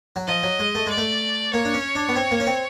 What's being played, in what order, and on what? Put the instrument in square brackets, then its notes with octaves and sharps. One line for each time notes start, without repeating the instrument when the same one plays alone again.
[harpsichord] F#3
[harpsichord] F3 [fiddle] D#5
[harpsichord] F#3
G#3
A3
[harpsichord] G#3 [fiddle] D5
[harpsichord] A3
[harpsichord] A#3 [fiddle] C#5
[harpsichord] D4
C#4
D4
B3
C4
A#3
C#4
C4